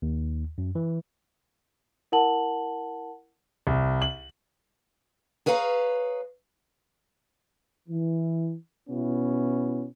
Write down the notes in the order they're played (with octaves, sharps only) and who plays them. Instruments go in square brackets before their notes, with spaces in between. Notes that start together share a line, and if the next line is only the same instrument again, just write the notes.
[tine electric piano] D#2
F#2
E3
[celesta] E4 A#4 F#5 A5 F#7
[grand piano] C2
F#7
[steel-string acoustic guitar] G#4 B4 C#5 F5 G5 A#5
[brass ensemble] E3
B2 B3 C#4 E4